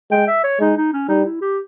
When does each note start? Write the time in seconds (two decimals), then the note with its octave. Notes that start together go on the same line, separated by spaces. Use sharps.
0.11 G#3 G5
0.27 E5
0.44 C#5
0.59 G#3 D#4
0.77 D#4
0.93 C#4
1.09 G3 D#4
1.25 E4
1.41 G4